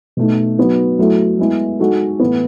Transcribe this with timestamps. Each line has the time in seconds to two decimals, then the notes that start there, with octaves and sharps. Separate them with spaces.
0.17 B2 A3 D#4
0.58 F#3 B3 D#4
0.99 F#3 A3 E4 A4
1.39 G#3 B3 E4
1.79 G#3 D#4 F#4 A4
2.20 A2 E3 B3